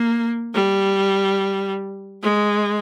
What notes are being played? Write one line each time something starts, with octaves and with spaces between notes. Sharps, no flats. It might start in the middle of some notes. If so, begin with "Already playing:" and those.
Already playing: A#3
G3
G#3